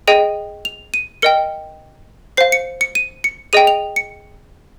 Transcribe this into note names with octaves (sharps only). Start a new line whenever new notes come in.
G#4 D#5 G5 D#7
F7
D#7
A#4 D#5 G5 C#7
C5 F5 C7
C#7
C#7
D#7
C#7
G#4 D#5 G5 D#7
F7
C#7